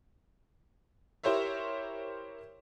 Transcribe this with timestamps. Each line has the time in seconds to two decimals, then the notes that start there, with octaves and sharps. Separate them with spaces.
1.24 E4 G4 A#4 C5 C#5 E5